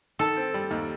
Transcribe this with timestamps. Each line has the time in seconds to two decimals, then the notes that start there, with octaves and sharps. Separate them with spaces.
0.19 D#3 A4
0.37 C4
0.54 G3
0.71 D#2